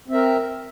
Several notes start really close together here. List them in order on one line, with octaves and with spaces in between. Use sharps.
C4 E5 A#4